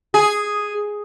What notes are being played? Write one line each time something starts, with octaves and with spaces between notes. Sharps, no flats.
G#4